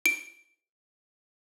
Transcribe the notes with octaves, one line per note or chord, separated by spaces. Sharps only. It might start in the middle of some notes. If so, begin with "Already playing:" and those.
D7